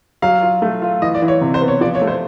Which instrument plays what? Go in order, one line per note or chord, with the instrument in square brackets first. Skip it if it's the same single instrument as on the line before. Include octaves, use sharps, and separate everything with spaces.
[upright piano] F#3 [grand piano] F5
[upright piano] F4
A3
F4
[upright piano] E3 [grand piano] D#5
[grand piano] D5
[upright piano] E3
[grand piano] C#5
[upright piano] C3
[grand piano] C5
[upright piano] B3
[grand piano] C#5
[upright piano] F3 [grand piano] D5
[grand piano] C#5
[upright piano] A3
[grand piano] C5